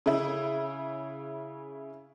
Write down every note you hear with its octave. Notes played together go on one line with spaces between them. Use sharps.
C#3 E4